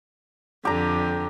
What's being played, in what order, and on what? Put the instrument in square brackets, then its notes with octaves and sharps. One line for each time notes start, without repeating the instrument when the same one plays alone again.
[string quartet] F2 D3 [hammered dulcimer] G4 A#5